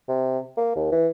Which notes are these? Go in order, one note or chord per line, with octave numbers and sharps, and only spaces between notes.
C3
A#3
D#2
E3